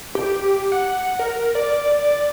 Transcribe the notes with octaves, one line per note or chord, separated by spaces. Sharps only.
G4
F#5
A#4
D5